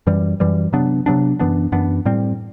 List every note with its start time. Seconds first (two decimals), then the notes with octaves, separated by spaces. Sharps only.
0.07 F#2 E3 G3
0.40 F#2 E3 G3
0.73 C3 F#3 B3 D4
1.06 C3 F#3 B3 D4
1.39 F#2 E3 B3 D4
1.72 F#2 E3 B3 D4
2.05 A2 G3 C4